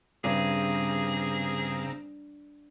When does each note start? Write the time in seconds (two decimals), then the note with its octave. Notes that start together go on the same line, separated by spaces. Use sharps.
0.24 G2 C#3 C4 G#4 A#5